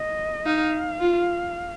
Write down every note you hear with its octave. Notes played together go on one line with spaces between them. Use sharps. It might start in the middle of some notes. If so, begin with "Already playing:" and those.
Already playing: D#5
D#4 F5
F4